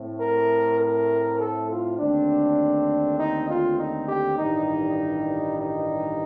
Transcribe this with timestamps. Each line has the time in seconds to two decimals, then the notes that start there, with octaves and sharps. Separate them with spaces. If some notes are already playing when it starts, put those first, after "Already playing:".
Already playing: A2 A3 C4
0.19 A#4
0.79 A#4
1.38 A4
1.69 F4
1.98 D#2 D3 A3 C4 D4
3.18 D#4
3.48 F4
3.78 D#4
4.07 G4
4.37 A1 G2 D#3 G3 D#4
5.57 D#4